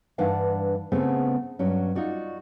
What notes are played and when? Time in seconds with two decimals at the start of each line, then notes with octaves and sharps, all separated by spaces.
0.18 G2 E3 D4 A#4 F5 F#5
0.92 C#3 A3 B3 C4
1.59 G2 F#3 C#4
1.95 D#4 F4 F#4 D5